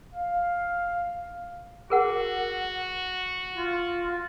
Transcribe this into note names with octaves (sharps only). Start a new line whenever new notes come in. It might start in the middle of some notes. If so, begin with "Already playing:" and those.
F5
F#4 G#4 A#4 F#5
F4